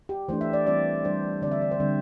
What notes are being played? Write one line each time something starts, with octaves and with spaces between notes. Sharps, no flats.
G4
E3 A3 D4 C5
E5
D5
E3 G3 C4 D5
E3 G3 D4 C5
D3 D5
C4 E5
D5
C5
D3 G3 C4